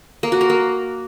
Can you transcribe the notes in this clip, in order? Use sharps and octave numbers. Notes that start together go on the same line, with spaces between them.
A#3
F#4
A#4
A#3